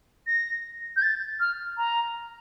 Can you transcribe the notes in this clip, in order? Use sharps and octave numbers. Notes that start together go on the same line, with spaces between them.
A#6
G6
A6
F6
A#5